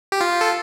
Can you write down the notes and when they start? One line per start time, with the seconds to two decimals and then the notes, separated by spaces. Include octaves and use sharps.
0.12 G4
0.21 F4
0.41 A4